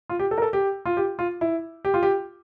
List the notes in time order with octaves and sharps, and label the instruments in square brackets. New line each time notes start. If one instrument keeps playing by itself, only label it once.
[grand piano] F4
G4
A4
A#4
A4
G4
F4
G4
F4
E4
G4
F4
G4